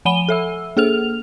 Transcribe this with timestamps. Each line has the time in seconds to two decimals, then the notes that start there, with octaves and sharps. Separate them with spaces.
0.05 F3 F#5 G#5 B5 D#7 G7
0.29 A4 E5 E6
0.77 A#3 G#4 A4 F6 F7